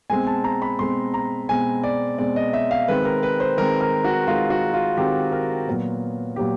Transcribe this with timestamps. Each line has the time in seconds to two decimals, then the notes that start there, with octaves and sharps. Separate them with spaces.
0.10 B2 G#3 C4 G#5
0.27 A5
0.44 A#5
0.62 B5
0.79 B2 G#3 C4 C6
1.14 A#5
1.49 B2 G#3 C4 G#5
1.83 D5
2.18 B2 G#3 C4 D5
2.36 D#5
2.53 E5
2.71 F5
2.88 D#3 G#3 C4 B4
3.05 A#4
3.23 B4
3.40 C5
3.58 D#3 G#3 C4 A#4
3.81 A#4
4.04 F#4
4.27 D#3 G#3 C4 F4
4.50 F#4
4.74 F4
4.97 D#3 G#3 C4 G4
5.32 A#4
5.67 A#2 F#3 B3
6.36 A#2 F#3 B3 G4